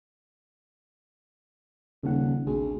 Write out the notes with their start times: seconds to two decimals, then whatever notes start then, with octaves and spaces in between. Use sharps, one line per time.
2.03 D#1 C#3 F#5
2.46 A1 D2 C3 G#4